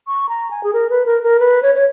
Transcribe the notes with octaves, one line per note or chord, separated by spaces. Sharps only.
C#6
A#5
G#5
G#4
A#4
B4
A#4
A#4
B4
C#5
C#5